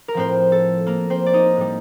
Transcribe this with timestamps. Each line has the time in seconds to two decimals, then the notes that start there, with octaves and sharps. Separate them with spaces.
0.08 A#4
0.14 A2 F3 C4 C5
0.52 A4
0.86 A#3 A#4
1.10 C4 C5
1.26 D5
1.34 D#4 D#5
1.57 A2 G3